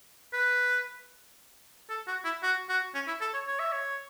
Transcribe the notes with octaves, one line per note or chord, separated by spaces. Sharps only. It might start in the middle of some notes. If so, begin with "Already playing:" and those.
B4
A4
F#4
E4
F#4
F#4
C#4
E4
A4
C#5
C#5
E5
C#5